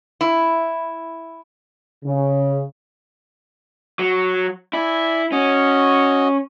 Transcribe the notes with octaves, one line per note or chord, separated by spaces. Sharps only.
E4
C#3
F#3
E4 D5 G#5
C#4 F#4 D#5